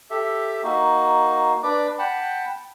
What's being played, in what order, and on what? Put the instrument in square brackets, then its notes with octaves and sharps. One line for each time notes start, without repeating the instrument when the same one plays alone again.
[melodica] G4 A4 E5
A#3 D#4 F#4
D4 B4 D5 D6
F#5 G5 A5 B5